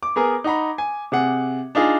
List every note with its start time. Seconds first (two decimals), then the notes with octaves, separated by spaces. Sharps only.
0.03 D6
0.16 B3 G#4 A#4
0.44 D#4 F#5 A#5 B5
0.78 G#5
1.12 C3 G#4 F#5
1.75 D4 D#4 F4 G#4